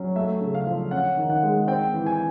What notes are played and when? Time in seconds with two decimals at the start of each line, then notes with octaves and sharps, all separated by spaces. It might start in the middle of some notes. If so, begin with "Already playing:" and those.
Already playing: F#3 C#4
0.16 A3 E5
0.41 C#3
0.54 F5
0.66 F3
0.91 C#4 F#5
1.17 D#3
1.30 F#5
1.43 G#3
1.67 C4 G5
1.94 E3
2.06 G#5